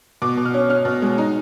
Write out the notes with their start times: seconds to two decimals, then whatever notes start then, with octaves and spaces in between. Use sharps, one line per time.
0.22 B2 D6
0.37 B2
0.45 F6
0.54 C#4
0.69 C#4 F6
0.85 B2
1.02 G#3
1.18 D#4